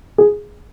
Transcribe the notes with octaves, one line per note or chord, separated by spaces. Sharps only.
G#4